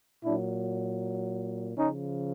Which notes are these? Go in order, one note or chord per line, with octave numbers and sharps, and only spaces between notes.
A#2 F#3 D4 E4
C#3 F3 C#4 D#4